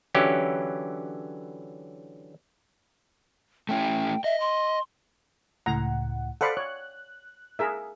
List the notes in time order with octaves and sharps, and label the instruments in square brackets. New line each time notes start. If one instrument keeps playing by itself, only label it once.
[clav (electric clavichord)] D3 E3 F#3 C#4 E4 G4
[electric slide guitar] A3 C#4 E4 [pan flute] G5
[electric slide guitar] D#5 [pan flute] E5
[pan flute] C6
[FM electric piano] C#2 A2 F#5 [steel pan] A#5
[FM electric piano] A4 C5 B5 [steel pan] D5 F5 F#5
[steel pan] C#5 [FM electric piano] F#6
[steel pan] G#4 A#4 E5